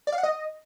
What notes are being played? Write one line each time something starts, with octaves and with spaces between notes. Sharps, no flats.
D5
F5
F#5
D#5